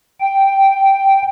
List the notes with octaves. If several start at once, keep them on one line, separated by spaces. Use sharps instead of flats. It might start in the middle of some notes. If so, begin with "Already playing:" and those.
G5